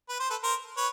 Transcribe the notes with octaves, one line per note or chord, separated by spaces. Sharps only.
B4
C5
A4 B4
A#4 C5
B4 C#5